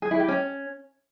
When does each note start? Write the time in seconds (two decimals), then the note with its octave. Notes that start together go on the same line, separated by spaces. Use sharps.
0.02 G#4
0.11 E4
0.20 G4
0.28 C#4